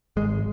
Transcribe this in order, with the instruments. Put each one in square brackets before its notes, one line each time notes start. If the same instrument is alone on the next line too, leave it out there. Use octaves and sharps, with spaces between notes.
[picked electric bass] G#1 G#3